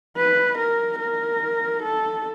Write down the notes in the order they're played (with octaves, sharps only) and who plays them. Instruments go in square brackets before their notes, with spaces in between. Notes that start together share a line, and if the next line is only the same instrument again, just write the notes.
[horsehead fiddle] B4
A#4
A#4
A4